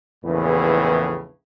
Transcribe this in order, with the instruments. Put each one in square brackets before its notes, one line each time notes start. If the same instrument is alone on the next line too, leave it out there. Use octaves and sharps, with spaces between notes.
[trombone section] A#1 E2 A2 C#3 B4